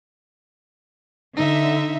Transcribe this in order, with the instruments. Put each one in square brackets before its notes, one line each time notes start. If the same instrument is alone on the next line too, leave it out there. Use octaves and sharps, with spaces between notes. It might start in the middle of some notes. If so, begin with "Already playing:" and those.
[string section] D3 E5 [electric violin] D#4